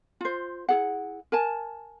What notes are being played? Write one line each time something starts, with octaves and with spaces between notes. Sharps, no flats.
F4 C5
E4 G#4 F#5
A#4 G#5 A5